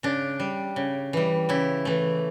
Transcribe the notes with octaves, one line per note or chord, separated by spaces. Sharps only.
C#3 D4
G3
C#3
E3 G3
C#3 E4
E3 A3